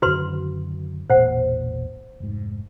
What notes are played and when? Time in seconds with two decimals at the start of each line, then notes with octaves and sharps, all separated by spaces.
0.02 F#2 D3 D#3 F#4 B4 C6
1.10 E1 A1 A#2 C5 F#5
2.20 F1 G#2